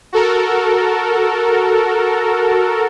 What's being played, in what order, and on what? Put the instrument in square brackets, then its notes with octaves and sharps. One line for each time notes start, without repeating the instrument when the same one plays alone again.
[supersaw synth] F#4 A4 A#4